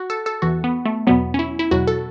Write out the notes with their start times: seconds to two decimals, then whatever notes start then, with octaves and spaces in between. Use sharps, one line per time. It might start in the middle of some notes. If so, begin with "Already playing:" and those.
Already playing: F#4
0.10 A4
0.26 A4
0.42 E2 E3 F#4
0.64 B3
0.86 A3
1.07 E2 B2 F#3 B3
1.34 C#4
1.39 E4
1.59 E4
1.71 E2 B2 F#3 F#4
1.87 A4